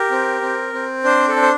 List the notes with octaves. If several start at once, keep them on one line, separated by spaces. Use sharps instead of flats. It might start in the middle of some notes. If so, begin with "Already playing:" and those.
Already playing: G4 A#4
C4
C4
C4
D4 C5
A4
D4
C5